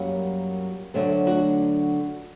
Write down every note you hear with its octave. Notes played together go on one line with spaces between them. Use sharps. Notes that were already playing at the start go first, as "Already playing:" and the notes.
Already playing: F#2 F#3 G3 A#3
D2 D3 F#3 A3 C4
D4 F#4